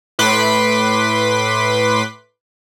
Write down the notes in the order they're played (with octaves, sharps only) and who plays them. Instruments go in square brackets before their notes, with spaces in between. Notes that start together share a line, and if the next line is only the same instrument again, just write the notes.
[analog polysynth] A2 B4 C6 D6 B6